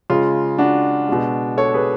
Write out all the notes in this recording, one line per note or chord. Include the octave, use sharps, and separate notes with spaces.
C#3 G#3 F4
D4 F#4
B2 G#3
A4 C#5
G#4 B4